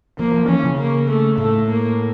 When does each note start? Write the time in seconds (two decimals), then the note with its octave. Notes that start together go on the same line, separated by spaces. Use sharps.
0.19 F3 A#3
0.34 F3
0.48 E3 C#4
0.64 C#3
0.78 A#3
1.09 A3
1.38 A2 A3
1.68 A#3